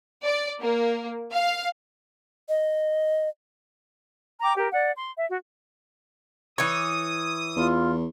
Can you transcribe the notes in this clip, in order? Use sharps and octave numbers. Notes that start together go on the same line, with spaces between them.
D5
A#3
F5
D#5
G5 A#5 D6
G4 A#4
D5 F#5
C6
E5
F#4
E3 C#5 D#6
E2 F4